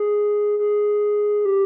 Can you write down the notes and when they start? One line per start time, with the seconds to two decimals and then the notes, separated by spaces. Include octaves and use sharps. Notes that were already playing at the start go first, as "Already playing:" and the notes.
Already playing: G#4
0.59 G#4
1.45 G4